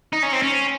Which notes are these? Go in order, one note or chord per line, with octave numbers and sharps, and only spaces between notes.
D#4
C#4
C4
C#4